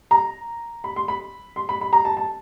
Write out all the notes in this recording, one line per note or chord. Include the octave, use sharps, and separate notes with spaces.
A#5
B5
C6
B5
C6
B5
B5
A#5
A5
A5